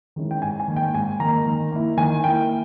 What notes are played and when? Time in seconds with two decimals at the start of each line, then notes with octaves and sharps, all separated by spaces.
0.16 D#3 G#3 C#4 E4
0.31 G5
0.42 G#2 G#5
0.60 G#5
0.68 D#3 A#3 D#4
0.76 G5
0.94 G#2 G#5
1.20 D#3 A#3 D#4 A#5
1.46 D#3
1.72 A#3 E4
1.97 D#3 G#5
2.24 A#3 E4 G5